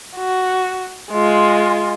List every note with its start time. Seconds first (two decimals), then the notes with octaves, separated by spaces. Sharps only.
0.17 F#4
1.12 G#3 F4